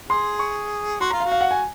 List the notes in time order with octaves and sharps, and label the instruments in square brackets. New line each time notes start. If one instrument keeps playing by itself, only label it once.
[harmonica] G#4 [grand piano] C6
[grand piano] C#6
[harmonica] F#4 [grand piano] C6
[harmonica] F4 [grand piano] A#5
[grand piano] F5
[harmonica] F#4
[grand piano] F5
F#5
G#5